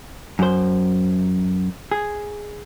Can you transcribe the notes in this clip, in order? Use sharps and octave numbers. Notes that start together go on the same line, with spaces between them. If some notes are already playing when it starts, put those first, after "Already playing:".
F#2 C5
G#4